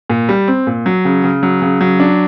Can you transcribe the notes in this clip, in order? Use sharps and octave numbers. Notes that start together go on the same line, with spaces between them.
A#2
G3
C4
A#2
F#3
C#3
C#3
F#3
C#3
F#3
D4